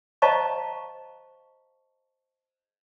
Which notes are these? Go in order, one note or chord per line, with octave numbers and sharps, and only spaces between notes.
C5 D#5 F5 A5 A#5 C#6